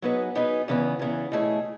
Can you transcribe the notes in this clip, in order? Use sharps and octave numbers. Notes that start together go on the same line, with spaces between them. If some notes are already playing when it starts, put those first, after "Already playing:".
F#3 B3 D#4 G#4 B4
F#3 B3 D#4 G#4 B4
E2 C#3 E3 B3
E2 C#3 E3 B3
B2 A3 E4 G#4 C#5